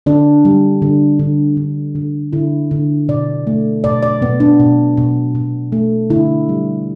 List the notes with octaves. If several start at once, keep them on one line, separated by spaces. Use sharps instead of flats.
D3 D4
G3
D3
D3
D3
D3
D3 E4
D3
B2 D5
A3
B2 D5
D5
B2 B3
D4
B2
B2
B2
A3
D3 E4
G3